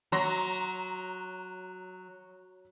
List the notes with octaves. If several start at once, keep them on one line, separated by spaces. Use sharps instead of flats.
F#3 A#5 C6 A#6